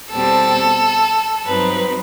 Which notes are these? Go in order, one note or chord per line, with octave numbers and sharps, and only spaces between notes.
E2 B2 G3 C4 A4
G2 F#3 C4 D#4 B4